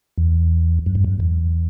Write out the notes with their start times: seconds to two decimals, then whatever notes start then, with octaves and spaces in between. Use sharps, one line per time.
0.18 E2
0.86 F#2
0.95 G2
1.04 F#2
1.20 E2